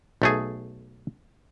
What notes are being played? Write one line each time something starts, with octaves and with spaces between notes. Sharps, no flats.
B1 A3 G#4